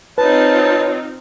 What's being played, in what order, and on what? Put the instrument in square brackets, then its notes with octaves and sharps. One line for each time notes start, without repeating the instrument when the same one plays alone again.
[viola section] C4 D#4 F4 [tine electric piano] B4 [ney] C#5 [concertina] A5